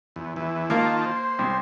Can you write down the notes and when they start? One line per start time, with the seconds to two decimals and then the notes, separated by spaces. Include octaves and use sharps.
0.16 E2
0.36 E2 E3
0.70 D#3 A#3 F4 A5
1.06 C5
1.39 C2